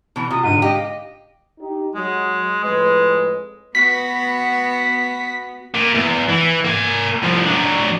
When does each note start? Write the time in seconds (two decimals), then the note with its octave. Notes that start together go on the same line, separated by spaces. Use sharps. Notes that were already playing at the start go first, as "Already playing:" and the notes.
0.16 B2 E3
0.30 C3 F4 D#6
0.43 G#2 D3 D#7
0.62 G4 D#5 F5
1.59 D#4 G4
1.95 F#3 G#3
2.64 F2 A2 G#3 B4
3.75 B3 F#4 B6
5.75 A#2
5.95 E2
6.29 E3
6.65 A#3 G#5
7.23 C2 F3
7.45 F#3 D4